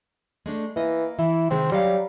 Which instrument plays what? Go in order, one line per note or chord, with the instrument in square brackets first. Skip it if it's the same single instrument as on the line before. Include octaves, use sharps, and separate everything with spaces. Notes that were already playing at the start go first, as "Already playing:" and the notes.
[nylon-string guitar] G#3 A3 D4
[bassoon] E3 [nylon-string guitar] A#3 D#5
[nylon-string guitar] E3 [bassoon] E4
[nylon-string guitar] C3 D#3 G#3 [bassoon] C4
[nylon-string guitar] F#3 D#5 F5 [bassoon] G3